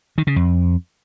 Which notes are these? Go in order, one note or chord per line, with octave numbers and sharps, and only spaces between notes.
D#3
C#3
F2